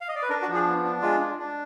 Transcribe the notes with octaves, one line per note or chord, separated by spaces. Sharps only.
F5
D#5
D5
B4
D4 A#4
F#4
F3
G#4
B3
D4
G#3 F4
D4
D4